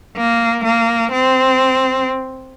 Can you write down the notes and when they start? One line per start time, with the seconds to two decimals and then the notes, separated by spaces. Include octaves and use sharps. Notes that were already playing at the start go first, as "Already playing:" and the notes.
0.17 A#3
0.64 A#3
1.12 C4